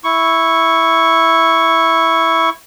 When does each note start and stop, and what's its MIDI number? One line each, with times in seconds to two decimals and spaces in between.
0.04 2.50 64
0.04 2.50 85